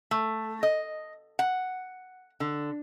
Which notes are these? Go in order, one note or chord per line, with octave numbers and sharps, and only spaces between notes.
A3
D#5
F#5
D3